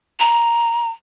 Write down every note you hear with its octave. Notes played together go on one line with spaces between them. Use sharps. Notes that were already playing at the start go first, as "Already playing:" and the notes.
A#5